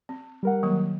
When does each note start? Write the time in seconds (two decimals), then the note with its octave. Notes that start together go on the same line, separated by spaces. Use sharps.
0.09 C4
0.43 G3 A#4 F#5
0.63 D#3 F#3 A#3